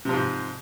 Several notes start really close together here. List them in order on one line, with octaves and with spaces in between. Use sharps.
C3 F3 G#2